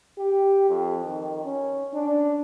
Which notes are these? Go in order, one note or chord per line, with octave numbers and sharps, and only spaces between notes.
G4
F2
D#3
C#4
D4